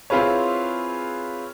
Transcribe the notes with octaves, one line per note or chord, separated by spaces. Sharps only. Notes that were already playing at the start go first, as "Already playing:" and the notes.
C4 E4 F4 G#4 B4 C#5